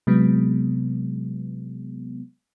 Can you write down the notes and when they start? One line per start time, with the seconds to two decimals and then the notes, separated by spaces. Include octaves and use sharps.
0.07 C3 F#3 G#3 B3